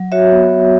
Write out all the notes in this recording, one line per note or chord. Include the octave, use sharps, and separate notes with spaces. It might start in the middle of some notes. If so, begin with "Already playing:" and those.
Already playing: F#3
F#4 C#5 E5
B3